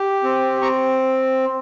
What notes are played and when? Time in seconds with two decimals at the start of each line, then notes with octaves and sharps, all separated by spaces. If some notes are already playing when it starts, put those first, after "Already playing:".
Already playing: G4
0.23 C4
0.61 C4 A#5 C#6